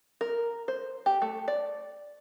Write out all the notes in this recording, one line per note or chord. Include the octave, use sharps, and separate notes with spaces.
A#4
C5
G4
A3
D5